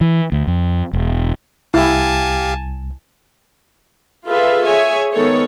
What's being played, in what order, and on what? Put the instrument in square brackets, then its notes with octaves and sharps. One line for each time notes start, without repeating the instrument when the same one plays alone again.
[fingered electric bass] E3
D2
F2
E1
[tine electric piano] C2 [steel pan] E4 [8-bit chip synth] G4 F5 [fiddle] G#5 A5
[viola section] F4 G#4 A4 B4 E5 F5
G#4 C#5 E5 G#5
D#3 G#3 B3 A4 C#5